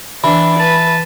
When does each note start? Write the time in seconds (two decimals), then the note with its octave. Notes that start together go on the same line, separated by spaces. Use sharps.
0.24 E3 D4 B5
0.59 B4 A5